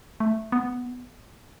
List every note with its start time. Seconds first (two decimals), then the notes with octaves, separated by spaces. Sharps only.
0.20 A3
0.52 B3